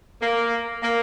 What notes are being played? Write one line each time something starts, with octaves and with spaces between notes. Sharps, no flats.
A#3
A#3